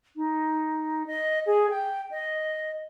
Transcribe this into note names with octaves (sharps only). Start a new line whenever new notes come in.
D#4
D#5
G#4
G5
D#5